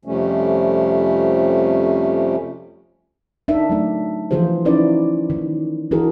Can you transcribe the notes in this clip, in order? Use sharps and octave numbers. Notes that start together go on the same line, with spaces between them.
F2 C3 F3 G3 A3 C#4
D4 D#4 A#4 E5
F#3 A3 D4
E3 F3 F4 G#4 C5
C#4 D#4 E4 B4 D5
D#3
E3 D4 E4 F#4 G#4 A#4